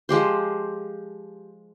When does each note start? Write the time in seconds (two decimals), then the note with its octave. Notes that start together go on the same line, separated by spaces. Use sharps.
0.09 F3 G#3 G4 C5